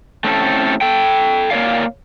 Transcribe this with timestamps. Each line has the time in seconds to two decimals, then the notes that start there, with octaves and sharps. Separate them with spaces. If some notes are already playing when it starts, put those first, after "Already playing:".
0.24 A3 C4 C#4 E4 A4
0.81 A4 G5
1.51 A#3 A#4 C#5 D5 F5